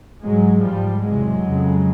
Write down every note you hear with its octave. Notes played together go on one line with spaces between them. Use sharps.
G#2 F#3 G#3
G#2 F3 G3
E2 C3 F#3 G#3
F2 C#3